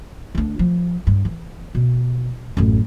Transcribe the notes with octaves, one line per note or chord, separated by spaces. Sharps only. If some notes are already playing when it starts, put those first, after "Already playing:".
D2 D4
F3
G2
E3
B2
A1 F#2